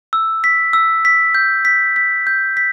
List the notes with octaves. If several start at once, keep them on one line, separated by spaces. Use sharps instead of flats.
E6
B6
E6
B6
G6
B6
B6
G6
B6